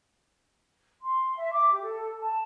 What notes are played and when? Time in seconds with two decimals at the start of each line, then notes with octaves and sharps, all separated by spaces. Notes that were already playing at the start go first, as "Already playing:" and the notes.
1.01 C6
1.37 E5
1.53 D6
1.71 G4
1.82 A4
2.19 A5